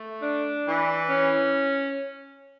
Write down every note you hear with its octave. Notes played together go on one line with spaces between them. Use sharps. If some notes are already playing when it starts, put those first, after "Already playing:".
Already playing: A3
D4
E3
C#4